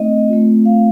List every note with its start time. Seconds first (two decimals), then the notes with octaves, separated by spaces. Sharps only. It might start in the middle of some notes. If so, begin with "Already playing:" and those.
Already playing: A3 C4 D#4 D#5
0.29 A3 C4 F4
0.65 F5